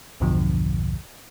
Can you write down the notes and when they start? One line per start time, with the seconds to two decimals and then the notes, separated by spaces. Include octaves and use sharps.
0.20 B1 E2 G2 B2 D3 F3